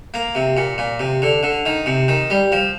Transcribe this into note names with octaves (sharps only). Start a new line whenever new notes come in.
A#3
C3
A#2
A#2
C3
D3
D3
D#3
C3
D#3
G3
F3